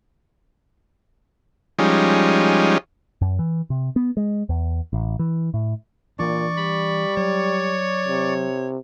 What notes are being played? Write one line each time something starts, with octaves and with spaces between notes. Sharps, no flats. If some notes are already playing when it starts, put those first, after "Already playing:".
F3 G3 G#3 C#4 D#4
F#2
E3
C3
B3
G#3
E2
A1
E3
A2
A#2 E3 D4 D5 C#6
G3 B5
F#3 C#5
C3